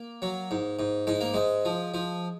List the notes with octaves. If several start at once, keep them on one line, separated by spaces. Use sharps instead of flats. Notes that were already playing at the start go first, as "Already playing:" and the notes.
Already playing: A#3
F#3
G#2
G#2
G#2 G#3
A#3
G#2 G#3
F3
F3